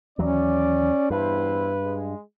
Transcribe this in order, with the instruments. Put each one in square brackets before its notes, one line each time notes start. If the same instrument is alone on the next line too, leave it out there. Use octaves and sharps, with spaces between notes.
[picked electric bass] D#2 E3 F#3 [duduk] C#4 [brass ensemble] D5
[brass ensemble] E2 E4 C5 [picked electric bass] G2 [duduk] B4
[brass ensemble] G#3